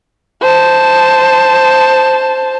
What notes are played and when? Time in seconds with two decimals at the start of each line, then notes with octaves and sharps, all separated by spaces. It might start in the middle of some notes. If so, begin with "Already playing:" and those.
0.41 C5 A5